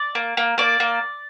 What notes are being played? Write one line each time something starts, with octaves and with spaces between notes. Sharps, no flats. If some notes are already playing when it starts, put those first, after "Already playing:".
Already playing: D5 D6
A#3
A#3
A#3 D5 D6
A#3